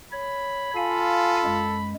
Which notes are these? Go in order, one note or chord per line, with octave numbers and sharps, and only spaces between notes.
C#5 B5
F4 A4 F5 G#5
F#2 G#3